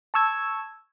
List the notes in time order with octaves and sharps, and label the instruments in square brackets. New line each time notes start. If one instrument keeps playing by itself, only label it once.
[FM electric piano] A5 C#6 E6 G#6